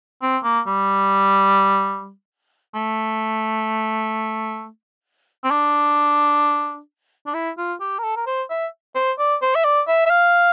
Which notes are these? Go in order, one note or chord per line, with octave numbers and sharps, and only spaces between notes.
C4
A#3
G3
A3
C4
D4
D4
E4
F4
G4
A#4
A4
A#4
C5
E5
C5
D5
C5
E5
D5
E5
E5
F5